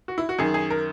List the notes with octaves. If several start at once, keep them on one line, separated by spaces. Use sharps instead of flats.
F#4
E4
F#4
F#2 D#3 G#4
G#4
A#4